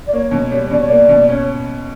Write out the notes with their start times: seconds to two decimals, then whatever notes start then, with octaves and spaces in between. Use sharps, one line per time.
0.06 D5
0.12 A#3 C#5
0.31 B2
0.52 G3
0.70 B2 D5
0.79 C#5
0.86 A#3 D5
1.09 B2
1.28 C#4 C#5